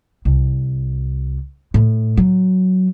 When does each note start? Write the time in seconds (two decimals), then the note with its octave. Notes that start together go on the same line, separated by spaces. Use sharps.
0.25 C2
1.74 A2
2.17 F#3